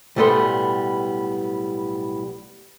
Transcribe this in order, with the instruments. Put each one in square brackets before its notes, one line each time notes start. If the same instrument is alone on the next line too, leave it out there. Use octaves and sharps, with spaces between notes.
[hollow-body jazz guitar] B1 A2 G3 B3 A4 C6